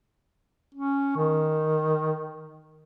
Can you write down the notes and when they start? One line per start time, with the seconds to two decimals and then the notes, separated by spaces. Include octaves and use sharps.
0.74 C#4
1.16 D#3